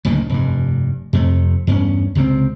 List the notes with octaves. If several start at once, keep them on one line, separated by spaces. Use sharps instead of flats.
F#1 D2 A#2 D#3
F1 G2
F2 C3 A3
E2 G2 C#4
C#2 C3 E3 C4